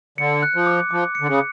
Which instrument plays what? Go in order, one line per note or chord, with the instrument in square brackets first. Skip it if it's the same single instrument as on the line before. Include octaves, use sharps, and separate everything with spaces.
[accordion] D3 [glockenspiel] C#7
[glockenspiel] F#6
[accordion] F3
[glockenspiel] D6
[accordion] F3 [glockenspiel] D6
[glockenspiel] C#7
[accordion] D3
C#3